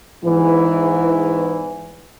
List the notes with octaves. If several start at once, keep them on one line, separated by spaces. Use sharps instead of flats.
E2 G#2 E3